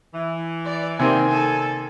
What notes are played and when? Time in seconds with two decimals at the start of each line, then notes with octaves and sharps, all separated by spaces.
0.14 E3
0.65 D5
0.99 C3 D#3 A#3 C4 G#5
1.31 A4